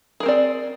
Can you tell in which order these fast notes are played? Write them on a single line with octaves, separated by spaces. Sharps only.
G#4 A#4 C4 D5